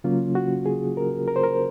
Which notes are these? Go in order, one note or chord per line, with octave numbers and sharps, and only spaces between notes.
C#3 F#3 A#3 C#4 F4
F#4
G#4
A#4
A#4
C5
A#4